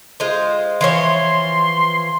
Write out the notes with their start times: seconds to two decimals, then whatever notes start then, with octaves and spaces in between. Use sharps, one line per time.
0.20 G#3 F4 C5
0.81 E3 F3 C#5 C6